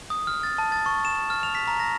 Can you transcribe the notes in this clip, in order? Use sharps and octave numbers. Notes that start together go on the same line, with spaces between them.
D#6
F6
A6
A5
A6
C#6
E7
F6
F7
B6
A#5
A#6